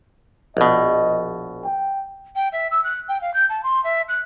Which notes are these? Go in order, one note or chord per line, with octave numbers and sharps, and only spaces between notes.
A#1 B2 D#5
G5
G5
E5
E6
F#6
G5
F5
G6
A5
C6
E5
F#6